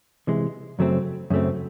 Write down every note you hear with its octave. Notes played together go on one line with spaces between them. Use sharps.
C3 E3 G#3
F#2 C#3 F#3 A3 C4
F#2 C#3 F#3 A3 C4